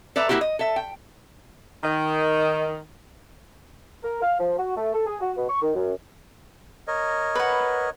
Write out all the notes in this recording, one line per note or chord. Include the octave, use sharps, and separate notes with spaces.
A4 B4 D5 E5 A#5
A#3 B3 E4 F#4 G4
D#5
A4 E5
G5
D#3
A#4
F5
F3
F#4
A3
A4
G#4
F#4
B2
C#6
D#3
F#2
A#4 C#5 D#5
B4 F#5